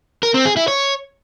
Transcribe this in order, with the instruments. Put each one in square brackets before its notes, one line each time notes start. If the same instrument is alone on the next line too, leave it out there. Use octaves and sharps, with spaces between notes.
[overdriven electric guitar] A#4
C4
G#4
E4
C#5